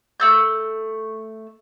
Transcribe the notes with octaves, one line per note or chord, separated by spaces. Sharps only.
A3 E6 G6